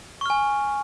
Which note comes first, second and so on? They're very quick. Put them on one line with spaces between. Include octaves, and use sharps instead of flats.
C#6 F6 G#5